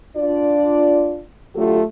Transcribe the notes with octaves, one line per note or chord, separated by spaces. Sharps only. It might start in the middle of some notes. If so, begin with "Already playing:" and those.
D4 F4 D5
D3 F#3 A3 F4 G4 A4